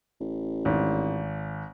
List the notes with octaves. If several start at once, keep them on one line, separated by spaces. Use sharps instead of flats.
A1
G#1